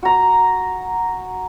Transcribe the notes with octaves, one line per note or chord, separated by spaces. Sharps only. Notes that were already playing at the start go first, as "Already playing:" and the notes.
F#4 A#5